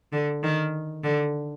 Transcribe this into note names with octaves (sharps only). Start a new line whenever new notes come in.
D3
D#3
D3